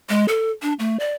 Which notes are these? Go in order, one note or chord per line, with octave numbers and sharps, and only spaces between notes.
G#3
A4
D4
A3
D5